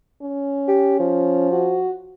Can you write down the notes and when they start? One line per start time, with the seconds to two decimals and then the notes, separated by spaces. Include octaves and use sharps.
0.22 C#4
0.68 G4
1.00 F3
1.51 F#4